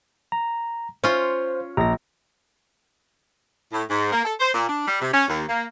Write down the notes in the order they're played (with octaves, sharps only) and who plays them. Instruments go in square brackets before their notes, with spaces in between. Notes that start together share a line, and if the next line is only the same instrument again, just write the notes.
[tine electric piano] A#5
[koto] C#4 F4 [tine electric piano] C5
[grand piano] A#1 [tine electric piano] A#5 A#6
[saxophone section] A2
G#2
A#3
A4
C5
A#2
D4
G3
C3
C#4
D#2
A#3